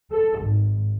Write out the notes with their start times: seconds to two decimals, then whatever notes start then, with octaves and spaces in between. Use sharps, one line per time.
0.11 A4
0.41 G#1